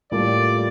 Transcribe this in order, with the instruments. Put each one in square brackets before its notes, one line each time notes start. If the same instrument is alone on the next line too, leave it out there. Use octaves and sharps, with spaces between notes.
[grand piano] A2 G3 A#3 F4 A4 [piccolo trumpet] D5